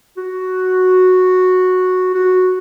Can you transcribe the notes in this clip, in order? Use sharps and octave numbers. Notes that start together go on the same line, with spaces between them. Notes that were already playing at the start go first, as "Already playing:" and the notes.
F#4
F#4